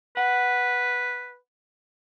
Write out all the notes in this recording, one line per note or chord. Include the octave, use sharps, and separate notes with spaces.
B4 F#5